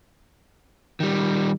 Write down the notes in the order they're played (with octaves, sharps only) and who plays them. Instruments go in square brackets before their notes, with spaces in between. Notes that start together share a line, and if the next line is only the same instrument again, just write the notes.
[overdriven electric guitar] D#3 G3